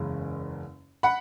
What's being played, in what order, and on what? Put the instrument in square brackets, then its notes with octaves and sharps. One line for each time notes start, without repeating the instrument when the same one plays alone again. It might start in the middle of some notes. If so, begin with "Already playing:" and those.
Already playing: [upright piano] F#1 E2 C#3 G#3 C#4
[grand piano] F#5 B5